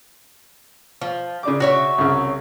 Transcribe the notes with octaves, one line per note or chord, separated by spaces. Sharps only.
F3
C#3 D4 D6
F#4 C#5 E5
C2 C#3